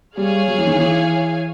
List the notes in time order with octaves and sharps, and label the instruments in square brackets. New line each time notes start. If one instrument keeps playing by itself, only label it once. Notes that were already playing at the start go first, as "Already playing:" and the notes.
[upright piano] G3 [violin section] G#4 C#5 F5 G#5
[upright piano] F#3
E3
D#3
E3